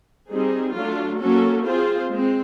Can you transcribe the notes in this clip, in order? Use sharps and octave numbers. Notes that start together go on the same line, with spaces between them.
G3 C4 D#4 G#4
F#3 A3 D4 F4
F#3 A#3 C#4 F#4 A4
C4 F4 G#4 C5
G#3 C4